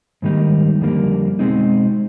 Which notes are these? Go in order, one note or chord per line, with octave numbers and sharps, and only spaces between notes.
G#2 D#3 G3 A#3 D#4
F2 D3 G3 A#3
B2 G#3 C4 D#4